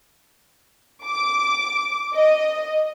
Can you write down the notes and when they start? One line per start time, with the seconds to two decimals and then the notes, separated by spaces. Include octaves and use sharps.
1.06 D6
2.15 D#5